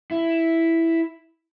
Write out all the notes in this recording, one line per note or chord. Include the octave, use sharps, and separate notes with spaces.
E4